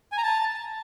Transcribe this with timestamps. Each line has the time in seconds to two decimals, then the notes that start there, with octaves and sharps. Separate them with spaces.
0.12 G#5
0.18 A#5
0.23 A5